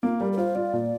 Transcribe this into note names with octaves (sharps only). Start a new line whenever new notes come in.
A#3 F4
G3 A#4
A#4
F4 C5
F4 D5
A#2